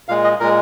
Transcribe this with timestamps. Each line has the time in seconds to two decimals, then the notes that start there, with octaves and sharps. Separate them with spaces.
0.09 A#2 G#3 F5
0.24 D#5
0.40 A#2 G#3 A#4